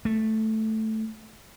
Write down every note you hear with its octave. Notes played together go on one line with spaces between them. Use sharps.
A3